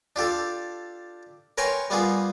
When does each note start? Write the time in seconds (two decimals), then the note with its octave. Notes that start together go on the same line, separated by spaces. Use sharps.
0.16 D4 F4 G4 A4
1.58 A#4 B4 C#5 G5 G#5 C6
1.90 G3 A#3 B3 F4 G#4